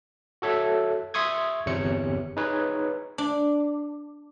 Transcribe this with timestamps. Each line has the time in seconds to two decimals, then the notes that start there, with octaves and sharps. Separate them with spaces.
0.42 F#4 A4 C#5 E5
1.14 E5 C6 C#6 D#6 G#6
1.66 G1 E2 C3 C#5 C#7
2.37 D#4 G#4 B4 C#5
3.18 D4